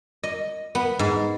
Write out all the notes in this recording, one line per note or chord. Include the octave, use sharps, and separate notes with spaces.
D#5
B3
G#2